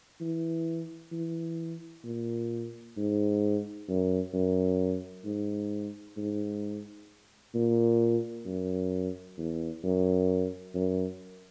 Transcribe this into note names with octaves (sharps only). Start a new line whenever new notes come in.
E3
E3
A#2
G#2
F#2
F#2
G#2
G#2
A#2
F#2
E2
F#2
F#2